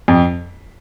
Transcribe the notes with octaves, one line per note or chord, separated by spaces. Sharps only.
F2